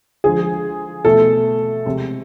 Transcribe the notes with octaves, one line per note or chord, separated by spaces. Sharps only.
D3 F3 G#3 G#4
B2 A3 A4
C3 G#3